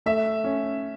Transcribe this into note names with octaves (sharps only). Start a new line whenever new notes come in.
A3 E5
C#4